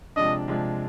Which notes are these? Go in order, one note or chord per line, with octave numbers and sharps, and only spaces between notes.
C3 F3 G#3 D4 D#5
C3 F3 G#3 D4